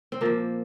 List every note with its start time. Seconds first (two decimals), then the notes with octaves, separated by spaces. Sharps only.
0.12 C4
0.21 A#2 F3 A#3